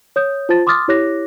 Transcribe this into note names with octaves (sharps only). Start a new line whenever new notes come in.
C#5 D#6 G6
F4 C5 A5 A6
C6 D6 D#6 F6 A6
E4 G4 C#5 D6 F#6 A#6